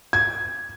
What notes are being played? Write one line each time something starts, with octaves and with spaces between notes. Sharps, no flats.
G#6